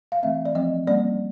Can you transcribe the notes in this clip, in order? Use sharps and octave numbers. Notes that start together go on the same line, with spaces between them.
F5
E3 A3 C4 E5
D5
F3 A3 C4 D#5
G3 A#3 C#4 D5